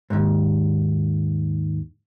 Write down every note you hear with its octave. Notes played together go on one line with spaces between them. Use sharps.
D#2 G#2